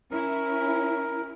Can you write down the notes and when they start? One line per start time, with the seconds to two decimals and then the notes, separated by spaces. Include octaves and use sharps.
0.11 C#4 E4 A#4